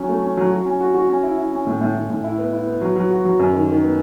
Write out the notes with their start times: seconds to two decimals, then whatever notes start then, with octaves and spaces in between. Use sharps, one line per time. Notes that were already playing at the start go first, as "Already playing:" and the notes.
Already playing: F#3 C#4
0.09 A3
0.23 C#4
0.37 F#3
0.51 F#4
0.65 C#4
0.80 F#4
0.94 F#4
1.09 C#4
1.23 E4
1.38 E4
1.52 C#4
1.67 A2
1.81 A2
1.95 A2
2.10 A2
2.24 E4
2.38 B3
2.53 E4
2.67 B3
2.81 F#3
2.96 F#3
3.10 F#4
3.25 F#3
3.39 F#2
3.53 D#3
3.68 D#3
3.82 B3